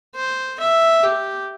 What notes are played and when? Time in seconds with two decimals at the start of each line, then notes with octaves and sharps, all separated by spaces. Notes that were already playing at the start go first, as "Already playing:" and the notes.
0.16 C5
0.60 E5
1.03 G4